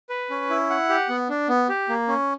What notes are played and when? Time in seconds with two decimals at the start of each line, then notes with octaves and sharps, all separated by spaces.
0.10 B4
0.30 C#4
0.50 E4
0.70 F#5
0.89 G4
1.09 B3
1.29 D4
1.49 B3
1.69 G4
1.89 A#3
2.08 C#4